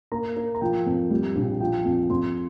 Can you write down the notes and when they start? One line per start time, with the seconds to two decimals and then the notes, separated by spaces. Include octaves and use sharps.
0.12 A#3 A#5
0.37 A#3
0.55 A#5
0.61 F3 G5
0.86 F2
1.11 G3
1.36 A#1
1.60 F3 G5
1.85 F2
2.10 F2 C6